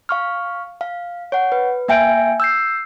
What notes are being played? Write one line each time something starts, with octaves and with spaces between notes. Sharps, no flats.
F5 C#6 F6
F5
C#5 F#5
B4
A#3 E5 G5 G#5 G6 D7
E6 G6 C7